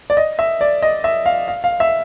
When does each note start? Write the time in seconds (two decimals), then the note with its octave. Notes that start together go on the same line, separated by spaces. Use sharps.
0.10 D5
0.17 D#5
0.39 E5
0.61 D5
0.82 D#5
1.04 E5
1.26 F5
1.48 F5
1.64 F5
1.80 E5